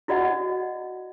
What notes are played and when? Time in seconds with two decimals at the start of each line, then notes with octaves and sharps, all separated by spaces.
0.08 E4 F#4 D5 D#5 F#5